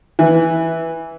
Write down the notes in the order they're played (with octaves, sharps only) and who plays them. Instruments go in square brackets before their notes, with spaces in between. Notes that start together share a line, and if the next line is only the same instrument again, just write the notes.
[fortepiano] E3